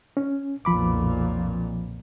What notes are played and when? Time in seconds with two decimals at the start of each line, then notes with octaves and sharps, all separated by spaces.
0.17 C#4
0.65 B1 F2 A#2 F3 B5 D6